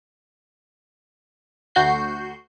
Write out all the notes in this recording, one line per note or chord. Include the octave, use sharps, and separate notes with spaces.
D2 F#4 G6 C7